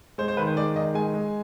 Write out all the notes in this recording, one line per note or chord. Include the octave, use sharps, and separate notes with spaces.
G#3 C5
C5
D#3 B4
C5
G#3 D5
D#3 D#5
G#3 G#5
G#3